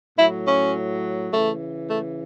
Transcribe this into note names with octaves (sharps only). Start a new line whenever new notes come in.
A2 F#3 E4
C#4
C#3 E3 A3
A3